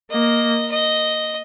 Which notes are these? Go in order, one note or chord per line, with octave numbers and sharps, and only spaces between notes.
A#3 D#5
D#5